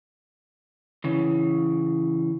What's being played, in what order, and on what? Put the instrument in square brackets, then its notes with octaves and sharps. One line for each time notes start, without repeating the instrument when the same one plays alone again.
[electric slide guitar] C#3 E3